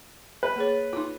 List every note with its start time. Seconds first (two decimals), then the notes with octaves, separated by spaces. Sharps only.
0.43 B4
0.56 A#3 G#4 C#5
0.93 D#4 F4